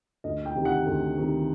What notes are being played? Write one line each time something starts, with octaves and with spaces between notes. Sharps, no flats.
D2 D#5
G5
C3 D#3
F#5
D2
C3 D#3